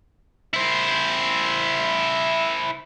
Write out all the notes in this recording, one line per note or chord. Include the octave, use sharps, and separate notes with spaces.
E4 C5